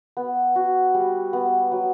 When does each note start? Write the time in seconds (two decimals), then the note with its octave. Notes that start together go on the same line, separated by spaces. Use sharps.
0.17 B3
0.56 F#4
0.94 G3
1.33 B3
1.72 F#3